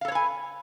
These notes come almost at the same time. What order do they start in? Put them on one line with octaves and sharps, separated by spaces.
F5 A4 C#5 B4 G#5